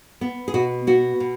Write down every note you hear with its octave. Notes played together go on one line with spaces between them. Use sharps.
B3
G#4
B2 F#4
B3 F#4
B2